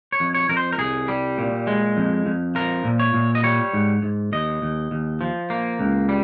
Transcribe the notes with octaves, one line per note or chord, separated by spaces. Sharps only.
C#5
F2
C#5
F2 A#4
C5
A#4
C2 G#4
G3
A#2
G#3
F2
F2
F3 A#4
A#2
C#5
A#2
D#5
G3 C#5
G#2
G#2
D#2 D#5
D#2
D#2
F3
A#3
C#2
G3